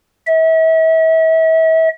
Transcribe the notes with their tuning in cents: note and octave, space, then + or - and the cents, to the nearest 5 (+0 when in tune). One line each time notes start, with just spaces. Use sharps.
E5 -35